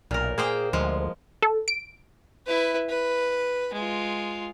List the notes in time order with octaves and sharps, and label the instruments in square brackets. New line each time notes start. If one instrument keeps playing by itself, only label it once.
[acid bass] B1 [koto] A#2 A#4
[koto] A#3 C5 G5 [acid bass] G#4
[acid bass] D2 [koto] F3 G#3
[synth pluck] A4
D7
[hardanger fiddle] E4 B4
B4
G#3 F4